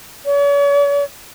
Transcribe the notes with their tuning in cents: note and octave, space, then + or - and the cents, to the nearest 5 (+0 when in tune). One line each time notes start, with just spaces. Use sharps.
C#5 +45